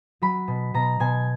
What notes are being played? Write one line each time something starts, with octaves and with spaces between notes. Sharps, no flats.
F#3 B5
B2
B2 A#5
B2 G#5